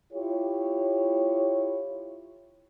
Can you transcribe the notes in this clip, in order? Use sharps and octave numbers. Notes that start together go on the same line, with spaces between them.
E4 F4 G4 C#5